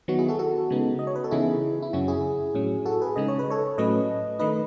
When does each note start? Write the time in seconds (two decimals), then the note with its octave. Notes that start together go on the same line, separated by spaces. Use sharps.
0.08 D#3 F#3 B3 D#4 F#4
0.19 E4 G#4
0.28 F#4 A4
0.39 F#4 A4
0.70 C#3 G#3 B3 D#4
0.99 D#5
1.07 C#5
1.16 B4
1.24 A4
1.31 C#3 E3 B3 D#4 E4 G#4
1.82 E4
1.93 F#2 C#3 F#3 C#4 F#4
2.08 E4 G#4
2.55 A2 F#3 C#4
2.86 F#4 A4
3.02 G#4 B4
3.16 C#3 G#3 D#4 D#5
3.28 C#5
3.39 B4
3.50 A4 C#5
3.78 A2 F#3 A3 C#4 B4 D#5
4.39 D#3 A3 D#4 B4 D#5